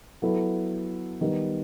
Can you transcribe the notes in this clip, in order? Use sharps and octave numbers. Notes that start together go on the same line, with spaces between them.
F#3 B3 E4 A4
D#3 G3 B3